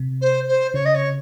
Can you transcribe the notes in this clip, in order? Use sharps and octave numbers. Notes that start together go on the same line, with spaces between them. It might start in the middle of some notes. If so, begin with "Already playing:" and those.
Already playing: C3
C5
C5
C#3 C#5
D#5
C#5